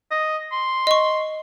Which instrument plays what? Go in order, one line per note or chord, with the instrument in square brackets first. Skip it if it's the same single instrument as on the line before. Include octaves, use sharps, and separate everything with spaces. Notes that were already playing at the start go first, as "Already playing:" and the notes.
[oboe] D#5
C6
[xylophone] D#5 C#6